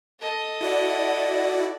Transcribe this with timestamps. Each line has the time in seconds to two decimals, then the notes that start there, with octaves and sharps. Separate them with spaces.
0.20 A4 D#5
0.61 E4 F#4 D5